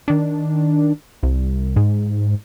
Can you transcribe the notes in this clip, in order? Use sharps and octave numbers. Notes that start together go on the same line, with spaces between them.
D#3 D4
C2
G#2